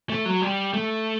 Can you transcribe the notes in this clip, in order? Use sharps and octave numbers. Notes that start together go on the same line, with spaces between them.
A3
F#3
G3
A3